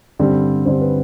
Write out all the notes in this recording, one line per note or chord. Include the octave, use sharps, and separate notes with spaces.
G2 D3 G3 C4
G2 D3 G3 C4 C5
B4